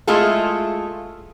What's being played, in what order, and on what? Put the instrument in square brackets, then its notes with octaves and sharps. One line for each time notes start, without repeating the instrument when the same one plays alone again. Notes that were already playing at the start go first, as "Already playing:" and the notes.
[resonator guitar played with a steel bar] G#3 A3 E4 F4 G#4 A4